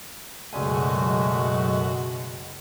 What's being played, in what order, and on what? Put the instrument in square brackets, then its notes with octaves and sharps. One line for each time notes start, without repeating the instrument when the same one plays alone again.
[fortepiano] C#2 D5 G#5 [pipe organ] F#2 F#4 [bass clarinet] B2 [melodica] G#3 A3